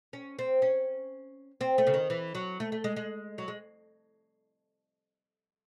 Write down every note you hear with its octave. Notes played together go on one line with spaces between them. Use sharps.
C#4
C4
C#4
C4
A3
C#3
D#3
E3
F#3
A3
A3
G#3
G#3
F#3
G#3